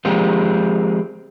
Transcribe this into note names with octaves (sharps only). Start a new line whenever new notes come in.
F3 G#3 C4 F4 G4